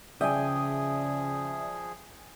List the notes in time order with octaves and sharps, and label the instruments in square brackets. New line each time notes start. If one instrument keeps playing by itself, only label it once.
[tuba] C#3 [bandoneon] F3 G#4 [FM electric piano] D5 E5 D#6 [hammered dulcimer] G5 G#5